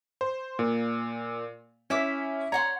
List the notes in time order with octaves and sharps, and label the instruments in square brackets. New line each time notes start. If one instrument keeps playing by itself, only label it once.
[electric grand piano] C5
A#2
[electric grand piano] C#4 [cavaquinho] E4 E5 D6
[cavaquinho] C#5 F#5 C6 [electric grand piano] A#5